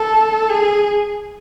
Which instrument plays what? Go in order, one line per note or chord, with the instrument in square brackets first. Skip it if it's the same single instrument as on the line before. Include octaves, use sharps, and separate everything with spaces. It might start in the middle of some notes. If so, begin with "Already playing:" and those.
Already playing: [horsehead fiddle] A4
G#4